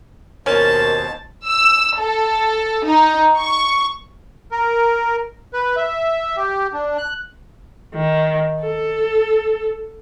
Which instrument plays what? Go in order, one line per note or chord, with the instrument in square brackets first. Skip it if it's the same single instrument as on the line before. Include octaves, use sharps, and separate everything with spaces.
[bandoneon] D#2 B2 C5 [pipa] C#4 [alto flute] A#4 [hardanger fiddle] A5
[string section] E6
A4
D#4
C#6
[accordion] A#4
B4
E5
G4
D4
F#6
[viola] D#3
A4